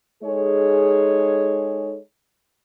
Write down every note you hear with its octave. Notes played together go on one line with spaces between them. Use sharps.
G#3 D#4 G#4 A4 C#5